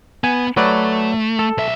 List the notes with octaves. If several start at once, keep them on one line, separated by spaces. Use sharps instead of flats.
B3 G#5
F#3 A3 B4 D5
A4
B1 E5